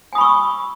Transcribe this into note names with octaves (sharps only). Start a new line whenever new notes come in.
G#5 B5 C#6 D#6 E6